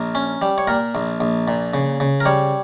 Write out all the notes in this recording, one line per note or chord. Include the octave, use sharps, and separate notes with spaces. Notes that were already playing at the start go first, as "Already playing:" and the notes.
Already playing: A#1 A#4
C#4
G3
C#5
A#2 A#4
A#1
A#1
A#2
C#3
C#3
A#4
G3 C#5